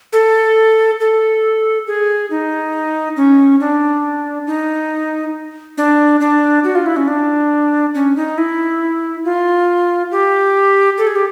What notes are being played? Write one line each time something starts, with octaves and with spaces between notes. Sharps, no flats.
A4
A4
G#4
D#4
C#4
D4
D#4
D4
D4
F#4
F4
E4
C#4
D4
C#4
D#4
E4
F4
G4
A4
G#4
G4